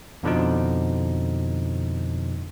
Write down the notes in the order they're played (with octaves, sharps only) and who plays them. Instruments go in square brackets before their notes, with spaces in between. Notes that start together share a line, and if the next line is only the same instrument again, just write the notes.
[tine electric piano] F2 B2 D3 F3 D#4